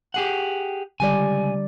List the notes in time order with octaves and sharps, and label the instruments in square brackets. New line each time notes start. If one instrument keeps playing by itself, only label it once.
[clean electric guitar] G4 G#4 F#5
[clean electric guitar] C#2 G#5 [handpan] D3 G3 D5